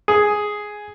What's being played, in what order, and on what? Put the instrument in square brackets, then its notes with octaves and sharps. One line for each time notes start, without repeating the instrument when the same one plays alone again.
[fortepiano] G#4